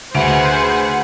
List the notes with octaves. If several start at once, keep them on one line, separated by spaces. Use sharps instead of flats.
D2 G#4 B4 C5 F#5 D7 F7